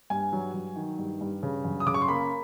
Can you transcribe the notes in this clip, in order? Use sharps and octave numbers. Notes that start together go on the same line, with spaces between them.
G2 G#5
F#3
F#3
D#3
G2
G2
C#3
F#2
D#6
C#3 D6
C#6
C6
A#3 B5